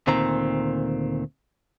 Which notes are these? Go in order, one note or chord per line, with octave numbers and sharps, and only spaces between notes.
D2 A#2 D#3 C4 A#5